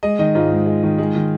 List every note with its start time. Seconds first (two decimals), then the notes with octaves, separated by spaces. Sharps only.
0.03 G#3 D#5
0.19 D#3 D#5
0.35 G#2 F4
0.51 G#2
0.66 G#3
0.83 D#3
0.98 G#3
1.15 D#3